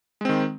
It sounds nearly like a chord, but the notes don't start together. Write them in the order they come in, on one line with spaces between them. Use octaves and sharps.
G#3 C4 D#3